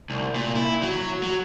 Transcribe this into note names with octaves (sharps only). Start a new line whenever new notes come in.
C2
A#2
E4
F#3
F#3